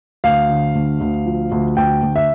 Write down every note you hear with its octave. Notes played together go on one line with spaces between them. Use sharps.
D2 F5
D3
D2
D2
F3
D2
D2 G5
D2
E5